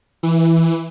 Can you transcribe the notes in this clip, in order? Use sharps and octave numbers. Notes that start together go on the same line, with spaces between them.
E3